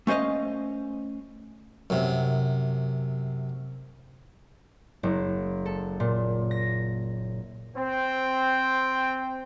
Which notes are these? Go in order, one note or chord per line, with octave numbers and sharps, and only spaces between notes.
A3 C#4 C5 D#5 F5
F#2 C3
F#1
A4
A#2
A#6
C4 G5